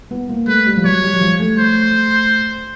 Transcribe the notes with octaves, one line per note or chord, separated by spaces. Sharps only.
B3
A#3
A3 B4
G3
F3
F#3 C#5
G3
F#3
F3
A3
C5